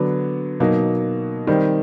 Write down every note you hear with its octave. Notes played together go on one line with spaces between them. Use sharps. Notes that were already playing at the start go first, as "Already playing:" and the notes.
Already playing: D3 F#3 B3 D4
B2 F#3 A#3 D#4
D#3 G3 C4